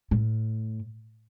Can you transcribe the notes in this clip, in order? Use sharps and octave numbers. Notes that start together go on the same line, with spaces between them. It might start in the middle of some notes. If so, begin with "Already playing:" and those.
A2